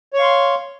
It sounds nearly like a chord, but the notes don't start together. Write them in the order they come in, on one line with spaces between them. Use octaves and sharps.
C#5 C#6 F5 C6